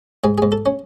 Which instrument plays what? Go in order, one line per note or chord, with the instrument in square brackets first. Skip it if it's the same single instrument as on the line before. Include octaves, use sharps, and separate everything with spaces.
[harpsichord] G#2 G#4
G#2 G#4
A4
C#4